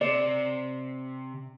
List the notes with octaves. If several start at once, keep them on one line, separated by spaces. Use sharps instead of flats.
C3 D5